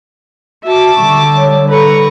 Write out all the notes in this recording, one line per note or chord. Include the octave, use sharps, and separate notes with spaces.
F#4 E5 A5 D6
D3 G3 C#6
C#5
A4 B4 A#5 C#6